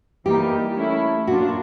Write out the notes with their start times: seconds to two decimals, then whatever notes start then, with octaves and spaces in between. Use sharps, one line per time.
0.25 E3 G3 A#3 D#4 G4
0.76 A3 C#4 E4 A4
1.27 A#2 F#3 A#3 D4 F4 F#4